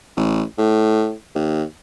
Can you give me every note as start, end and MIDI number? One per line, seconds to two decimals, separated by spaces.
0.17 0.43 33
0.58 1.13 45
1.35 1.63 39